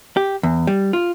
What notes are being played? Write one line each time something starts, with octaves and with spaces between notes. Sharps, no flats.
G4
E2
G3
F4